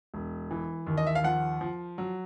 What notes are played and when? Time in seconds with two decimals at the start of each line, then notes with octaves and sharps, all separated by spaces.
0.14 E1
0.51 E3
0.87 D#2
0.98 D#5
1.07 E5
1.15 F5
1.24 F3 F#5
1.61 F3
1.98 F#3